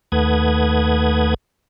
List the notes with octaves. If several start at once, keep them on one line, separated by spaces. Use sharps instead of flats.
D#2 A3 B4 F#5 D#6 G#6